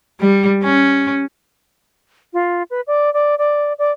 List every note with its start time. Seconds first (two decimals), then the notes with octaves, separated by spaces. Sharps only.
0.20 G3
0.64 C#4
2.33 F4
2.70 B4
2.87 D5
3.14 D5
3.38 D5
3.79 D5